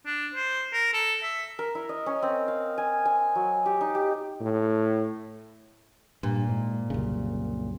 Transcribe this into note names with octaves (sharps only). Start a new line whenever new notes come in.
D4
C5
A#4
A4
E5
A#4
E4
D#5
C#4
C4
F5
G#5
G#5
F#3
G4
D#4
G4
A2
G2 A#2
G#2
C2 F#2 C#3